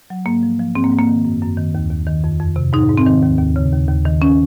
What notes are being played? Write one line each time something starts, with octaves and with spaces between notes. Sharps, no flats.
F#3
G#2 A#3
F3
F3
G#2 C4
A#3
G#2
A#3
D#3
F#2
F#2
D#3
D#2
D#2
D#3
F2
F2
C3
G#2 D#4
G#2
C4
D#3
D#2
D#2
C#3
D#2
D#2
D#3
C#4